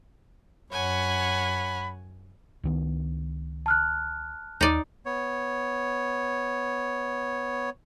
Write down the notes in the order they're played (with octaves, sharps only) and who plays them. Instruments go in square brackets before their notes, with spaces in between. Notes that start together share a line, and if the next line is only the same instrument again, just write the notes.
[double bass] F#2 [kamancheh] C#5 F#5 [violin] G#5 [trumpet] B5
[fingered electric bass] C#2 D#3 B3
[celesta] A5 F6 F#6
[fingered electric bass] D#2 [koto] D#4 D5
[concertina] B3 C#5